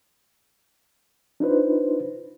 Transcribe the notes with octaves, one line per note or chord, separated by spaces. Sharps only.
D4 D#4 F4 B4 C5